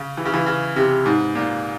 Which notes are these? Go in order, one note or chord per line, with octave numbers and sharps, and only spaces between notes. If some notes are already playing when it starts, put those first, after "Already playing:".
Already playing: C#3
E3
C#3
E3
C#3
C3
G#2
A#2